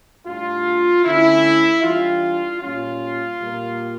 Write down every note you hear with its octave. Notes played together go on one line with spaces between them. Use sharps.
A2 G3 D4 F4
D3 A3 C#4 E4
E3 G3 D4 F4
A#2 G3 C#4 F4
A#2 G3 A#3